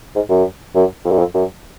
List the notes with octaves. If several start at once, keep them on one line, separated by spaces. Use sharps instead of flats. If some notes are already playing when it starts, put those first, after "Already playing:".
G#2
F#2
F#2
F2
F#2
F2
F#2